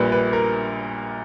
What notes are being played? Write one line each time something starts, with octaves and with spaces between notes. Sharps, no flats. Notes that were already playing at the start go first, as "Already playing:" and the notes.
Already playing: A#1 A#2 G3 B4
B4
A#4